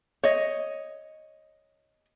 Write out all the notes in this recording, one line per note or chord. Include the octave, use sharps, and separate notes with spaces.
C#5 D#5